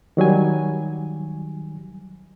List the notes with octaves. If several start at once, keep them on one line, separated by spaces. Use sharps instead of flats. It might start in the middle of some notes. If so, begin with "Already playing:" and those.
D#3 F#3 G3 G#5